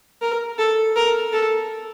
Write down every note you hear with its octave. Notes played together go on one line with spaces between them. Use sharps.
A#4
A4
A#4
A4